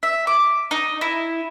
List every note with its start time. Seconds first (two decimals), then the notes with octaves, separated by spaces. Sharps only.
0.03 E5
0.27 D6
0.71 D#4
1.01 E4